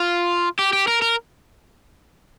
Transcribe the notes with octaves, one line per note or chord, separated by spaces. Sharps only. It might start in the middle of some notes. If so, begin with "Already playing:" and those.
Already playing: F4
G4
G4
A#4
A#4